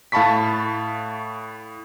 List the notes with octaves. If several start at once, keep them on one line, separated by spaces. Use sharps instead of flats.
A2 F5 A5 B5 C#6 B6